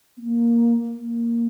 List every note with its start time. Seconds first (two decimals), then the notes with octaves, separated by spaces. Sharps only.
0.17 B3
0.22 A#3
0.95 A#3